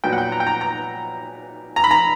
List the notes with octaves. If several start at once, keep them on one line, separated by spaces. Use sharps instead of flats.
A#2 F#3 B3 G5
F#5
G5
A#5
G5
A#5
A#5
A#5
B5
A#5